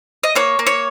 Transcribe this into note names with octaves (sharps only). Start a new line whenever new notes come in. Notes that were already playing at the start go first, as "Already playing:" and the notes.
D#5
A#3 C#5
A#3
C#5